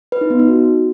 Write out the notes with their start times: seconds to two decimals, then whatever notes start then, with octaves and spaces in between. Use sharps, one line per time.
0.12 B4
0.21 D#4
0.30 B3
0.39 D#4
0.48 F#4